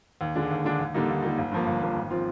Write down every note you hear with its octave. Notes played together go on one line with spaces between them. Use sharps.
D#2
D3 G#3 D4
D#2
D3 G#3 D4
D#2
D3 G3 A#3 D#4
D#2
D3 G3 A#3 D#4
G1
G2 F3 A#3
G1
G2 F3 A#3
G#1
F3 C4 F4